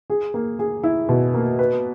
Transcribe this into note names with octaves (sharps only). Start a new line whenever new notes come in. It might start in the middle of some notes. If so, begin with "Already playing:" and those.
G#4
A#3
G#4
E4
B2
A#3
B4